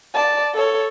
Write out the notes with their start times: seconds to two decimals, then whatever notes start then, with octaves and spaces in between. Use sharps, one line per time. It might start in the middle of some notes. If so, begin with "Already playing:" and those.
0.14 D5 A5
0.55 A4 C#5